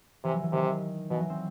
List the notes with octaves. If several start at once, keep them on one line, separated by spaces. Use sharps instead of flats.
C3 E3
F#3
E3
C3 D#3
B2 E3
F#3
C4